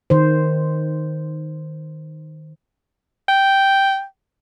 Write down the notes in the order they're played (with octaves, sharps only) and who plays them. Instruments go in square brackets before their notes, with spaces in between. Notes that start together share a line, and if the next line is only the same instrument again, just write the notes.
[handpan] D#3 C5
[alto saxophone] G5